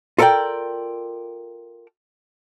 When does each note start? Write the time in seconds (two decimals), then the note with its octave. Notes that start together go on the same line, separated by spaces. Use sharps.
0.18 F4 A4 A#4 C#5 D5 G5